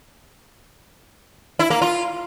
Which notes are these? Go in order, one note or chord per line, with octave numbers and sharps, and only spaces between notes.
E4
A#3
F4